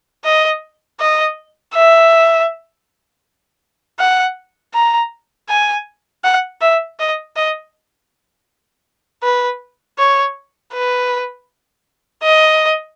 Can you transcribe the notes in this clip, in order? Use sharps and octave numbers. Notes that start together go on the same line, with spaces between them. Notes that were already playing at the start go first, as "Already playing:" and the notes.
D#5
D#5
E5
F#5
A#5
G#5
F#5
E5
D#5
D#5
B4
C#5
B4
D#5